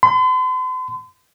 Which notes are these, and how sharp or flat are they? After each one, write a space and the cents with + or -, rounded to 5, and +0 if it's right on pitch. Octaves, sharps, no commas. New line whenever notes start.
C6 -45